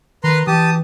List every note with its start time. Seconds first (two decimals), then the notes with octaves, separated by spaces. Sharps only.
0.24 D#3 B4 A#5 C6
0.47 E3 G4 A5 D#6